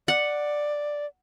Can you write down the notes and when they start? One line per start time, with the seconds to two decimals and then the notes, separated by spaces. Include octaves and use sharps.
0.08 D5 F#5